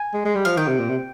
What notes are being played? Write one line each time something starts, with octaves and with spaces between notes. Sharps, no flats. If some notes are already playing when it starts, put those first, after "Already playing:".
Already playing: G#5
G#3
G#3
G3
F3 F5
D#3 G5
C3
A#2
C3